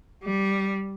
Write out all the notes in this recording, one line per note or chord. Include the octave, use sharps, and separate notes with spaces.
G3